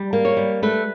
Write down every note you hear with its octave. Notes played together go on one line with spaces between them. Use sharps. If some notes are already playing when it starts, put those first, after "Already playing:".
Already playing: G3
A#3
C#5
G3
A3 B4